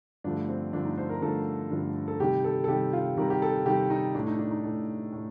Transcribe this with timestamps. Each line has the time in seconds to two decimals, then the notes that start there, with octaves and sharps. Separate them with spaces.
0.24 G2 D3 F3 A3 D4
0.49 C4
0.73 G2 D3 F3 A3 D4
0.85 D#4
0.98 C5
1.09 A#4
1.22 G2 D3 F3 A3 A4
1.71 G2 D3 F3 A3
2.08 A4
2.20 C3 D#3 G3 G4
2.44 A4
2.64 A4
2.68 C3 D#3 G3 G4
2.93 F4
3.17 C3 D#3 G3 A#4
3.30 G4
3.42 A4
3.66 C3 D#3 G3 G4
3.90 D#4
4.15 A2 A3 D4
4.27 D#4
4.39 D4
4.51 D#4
4.64 A2 A3
5.12 A2 A3